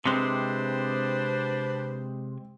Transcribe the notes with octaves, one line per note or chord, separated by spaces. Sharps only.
C3 G#3 C4 D4 B4 C5